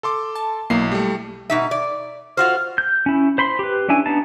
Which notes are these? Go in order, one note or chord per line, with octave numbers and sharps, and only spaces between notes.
A4 C6 D6
A5
B1 A#3 E4 C7
G3 A3
B2 D#4 E5
D5
F4 F#4 C5 F6
G6
C#4 E4
C5 B5 C6
G4 B4
C#4 D4 E4 G#5
B3 D4 D#4 A5